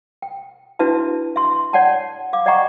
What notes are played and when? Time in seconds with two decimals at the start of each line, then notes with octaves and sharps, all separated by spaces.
0.22 G5
0.79 D4 E4 F#4 B4 E5 A5
1.36 E5 C6
1.73 C#5 D5 F#5 G5 A5
2.33 F5 D6
2.46 D5 D#5 F#5 G5 A#5 C#6